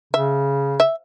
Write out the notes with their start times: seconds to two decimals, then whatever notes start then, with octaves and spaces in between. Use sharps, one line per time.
0.13 C#3 E5
0.80 E5